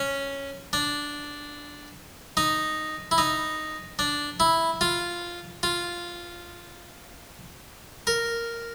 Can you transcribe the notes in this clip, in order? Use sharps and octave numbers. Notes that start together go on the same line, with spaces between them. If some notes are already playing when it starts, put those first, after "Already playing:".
Already playing: C#4
D4
D#4
E4
D#4
D4
E4
F4
F4
A#4